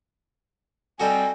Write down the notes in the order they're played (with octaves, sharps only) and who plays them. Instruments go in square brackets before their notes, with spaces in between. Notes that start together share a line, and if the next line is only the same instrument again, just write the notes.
[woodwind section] G3 C4 [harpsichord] F#4 A4 D#5 [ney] G#5